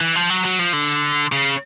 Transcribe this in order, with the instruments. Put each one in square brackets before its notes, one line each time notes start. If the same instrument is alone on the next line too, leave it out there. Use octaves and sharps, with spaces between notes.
[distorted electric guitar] E3
F3
F#3
F#3
F3
D3
C#3